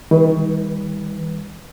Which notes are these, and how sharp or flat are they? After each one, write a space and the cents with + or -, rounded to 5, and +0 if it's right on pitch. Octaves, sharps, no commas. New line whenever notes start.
D#3 +45 G3 +35 B4 +0